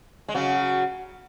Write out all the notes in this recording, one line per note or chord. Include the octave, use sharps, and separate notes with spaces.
G#3
C#3 F#3